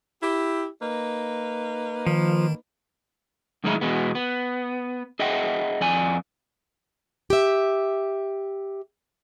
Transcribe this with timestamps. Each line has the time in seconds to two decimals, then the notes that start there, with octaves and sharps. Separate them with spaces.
0.23 E4 G4
0.82 A#3 D#4 B4
2.07 D#3 F3
3.64 F#2 A2 D#3 G#3 D#4 E4
3.81 E2 B2 G#3 B3
4.15 B3
5.19 G#4 D#5 E5 F#5 G5
5.81 F2 D5 G#5
7.30 G4 E5